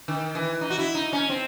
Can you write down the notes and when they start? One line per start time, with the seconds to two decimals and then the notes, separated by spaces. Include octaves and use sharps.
0.08 D#3
0.35 E3
0.61 D#4
0.70 F#4
0.79 E4
0.95 D#4
1.13 C#4
1.29 C4